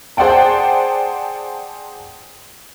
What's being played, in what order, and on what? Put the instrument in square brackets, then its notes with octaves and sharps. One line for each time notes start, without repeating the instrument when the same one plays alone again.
[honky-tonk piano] G#4 C5 D5 F#5 G5 A5